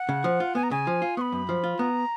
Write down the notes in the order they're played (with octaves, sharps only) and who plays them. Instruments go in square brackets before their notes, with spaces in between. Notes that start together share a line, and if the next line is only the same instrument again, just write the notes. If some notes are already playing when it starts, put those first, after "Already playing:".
Already playing: [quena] F#5
[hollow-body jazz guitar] C#3
F3
F4
[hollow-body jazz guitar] B3 [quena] G#5
[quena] A#5
[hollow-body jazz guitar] C#3 [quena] G#5
[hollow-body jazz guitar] F3
F4
[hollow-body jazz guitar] B3 [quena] C#6
[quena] B5
[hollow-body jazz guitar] F#2
F3
F4
[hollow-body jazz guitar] B3 [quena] A#5